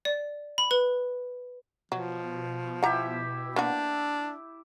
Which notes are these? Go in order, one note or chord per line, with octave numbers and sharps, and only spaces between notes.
D5
B5
B4
B2 F3 F#3
E4 G4 E5 F#5 A#5
A#3 B3 D4 F#4